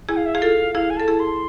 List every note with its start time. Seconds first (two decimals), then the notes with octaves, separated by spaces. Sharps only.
0.09 E4 G#4 G#5
0.17 F5
0.26 E5
0.34 G#4 F5
0.42 F4 A4
0.75 E4 G#4 F5
0.90 G#5
0.97 A4 A5
1.08 E4 G#4
1.20 C6